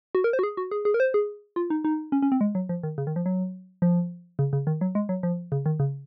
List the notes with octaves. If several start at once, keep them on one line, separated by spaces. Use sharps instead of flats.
F#4
A#4
C5
F#4
G#4
F#4
G#4
G#4
A#4
C5
G#4
F4
D#4
D#4
C#4
C#4
C4
G#3
F#3
F3
D#3
C#3
D#3
F3
F#3
F3
C#3
C#3
D#3
F#3
G#3
F#3
F3
C#3
D#3
C#3